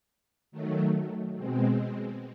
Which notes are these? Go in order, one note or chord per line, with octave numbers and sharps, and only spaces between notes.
D#3 F#3 A3
B2 G#3 C4